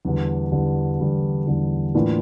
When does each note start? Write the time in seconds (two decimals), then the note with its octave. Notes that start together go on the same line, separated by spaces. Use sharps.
0.05 E2 D3 G3
0.52 E2 D3 G3
1.00 E2 D3 G3
1.47 E2 D3 G3
1.95 A2 E3 A#3 D4 F4